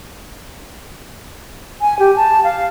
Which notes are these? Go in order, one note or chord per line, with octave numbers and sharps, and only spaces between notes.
G#5
G4
A5
F5